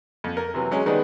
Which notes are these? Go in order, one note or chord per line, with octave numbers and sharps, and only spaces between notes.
F2
A#4
C3 E3 F#3
F#3 G#3 C#4
D#3 G3 G#3 B3